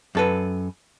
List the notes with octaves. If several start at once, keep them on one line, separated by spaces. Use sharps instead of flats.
F#2 A4 B4